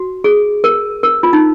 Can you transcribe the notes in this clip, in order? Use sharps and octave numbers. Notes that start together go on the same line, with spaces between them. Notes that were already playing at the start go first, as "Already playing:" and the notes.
Already playing: F#4
G#4
A#4
A#4
F4
D#4